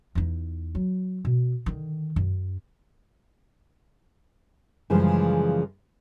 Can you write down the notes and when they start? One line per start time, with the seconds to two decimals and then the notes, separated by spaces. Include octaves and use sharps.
0.15 E2 D#4
0.75 F#3
1.25 B2
1.66 D3 D#3
2.16 F#2
4.90 F#2 C#3 E3 F3 G3 G#3